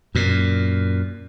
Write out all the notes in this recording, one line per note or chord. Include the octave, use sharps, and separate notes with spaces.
F#2 A#2